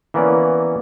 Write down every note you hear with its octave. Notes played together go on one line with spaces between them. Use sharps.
E3 A#3 B3 C#4 D5